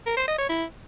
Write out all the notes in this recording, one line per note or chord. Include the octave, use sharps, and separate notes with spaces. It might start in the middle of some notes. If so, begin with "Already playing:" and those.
A#4
C5
D#5
C#5
E4